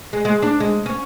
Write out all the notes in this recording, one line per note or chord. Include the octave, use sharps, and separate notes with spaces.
G#3
G#3
D4
G#3
C#4